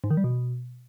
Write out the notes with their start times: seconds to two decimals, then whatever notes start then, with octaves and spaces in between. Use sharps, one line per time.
0.04 G#2
0.10 D#3
0.17 G3
0.24 B2